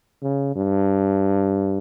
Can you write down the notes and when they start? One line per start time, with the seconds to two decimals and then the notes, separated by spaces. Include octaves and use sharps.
0.22 C#3
0.56 G2